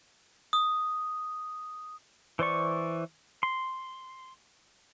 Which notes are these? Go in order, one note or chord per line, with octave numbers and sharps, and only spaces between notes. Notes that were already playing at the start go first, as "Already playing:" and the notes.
D#6
E3 C5 D5 C#6
C6